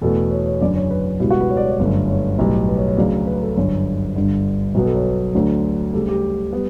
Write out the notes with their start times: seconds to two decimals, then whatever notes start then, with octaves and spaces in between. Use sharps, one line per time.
0.02 E2 B2 A3 A4
0.31 C#5
0.46 C#5
0.60 F#1 F#2 D3 D5
0.76 C#5
0.91 B4
1.20 C#2 B2 G3 B3 E4
1.31 F#4
1.40 B4
1.50 C#5
1.57 D5
1.64 C#5
1.72 D5
1.78 G1 F#2 D3 A3 C#5
2.09 C#5
2.39 B1 A2 G3 B3
2.68 B4
2.78 C#5
2.88 C#5
2.97 D2 C#3 F#3 D5
3.27 B4
3.42 A4
3.57 G1 F#2 D3 C#5
4.16 G1 G2 D3
4.75 B1 B2 F#3 B3
4.85 A4
4.95 C#5
5.05 B4
5.34 D2 D3 F#3 A3
5.93 D2 C#3 G3 A4
6.08 G4
6.53 G3 B3